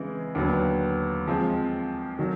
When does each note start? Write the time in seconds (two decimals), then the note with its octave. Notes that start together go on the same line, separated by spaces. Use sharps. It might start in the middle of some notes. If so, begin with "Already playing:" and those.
Already playing: C#3 E3 G#3 C4
0.35 D#2 D3 F#3 B3
1.27 F3 G#3 C4
2.19 D#3 F#3